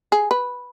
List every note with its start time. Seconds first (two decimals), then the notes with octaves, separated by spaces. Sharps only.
0.12 G#4
0.31 B4